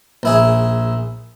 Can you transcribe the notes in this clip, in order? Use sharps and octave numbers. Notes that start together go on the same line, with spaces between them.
A#1 E4 G#4